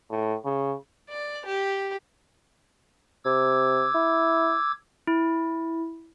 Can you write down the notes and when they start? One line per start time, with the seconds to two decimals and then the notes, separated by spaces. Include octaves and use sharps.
0.10 A2
0.45 C#3
1.10 D5
1.46 G4
3.25 C3 D6 E6 G#6
3.94 E4
5.07 E4